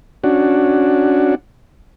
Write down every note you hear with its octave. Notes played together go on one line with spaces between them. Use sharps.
C#4 D4 F#4